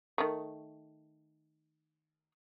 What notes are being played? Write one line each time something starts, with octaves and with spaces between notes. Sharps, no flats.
D#3 A3